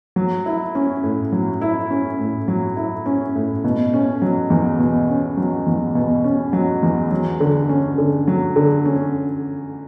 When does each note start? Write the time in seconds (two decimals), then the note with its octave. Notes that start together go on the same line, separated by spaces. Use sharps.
0.16 F#3
0.46 E4
0.75 C#4
1.04 A2
1.32 F#3
1.61 E4
1.90 C#4
2.19 A2
2.48 F#3
2.77 E4
3.06 C#4
3.35 A2
3.64 B2
3.94 C#4
4.22 F#3
4.50 E2
4.79 B2
5.09 C#4
5.37 F#3
5.66 E2
5.95 B2
6.24 C#4
6.53 F#3
6.83 E2
7.11 F#3
7.40 D3
7.69 C#4
7.98 D3
8.28 F#3
8.56 D3
8.85 C#4